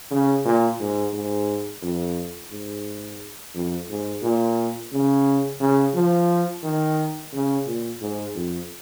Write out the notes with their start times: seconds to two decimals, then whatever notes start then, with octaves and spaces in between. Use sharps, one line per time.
0.11 C#3
0.45 A#2
0.80 G#2
1.13 G#2
1.82 F2
2.51 G#2
3.54 F2
3.89 G#2
4.22 A#2
4.92 C#3
5.60 C#3
5.95 F3
6.63 D#3
7.33 C#3
7.66 A#2
8.01 G#2
8.35 F2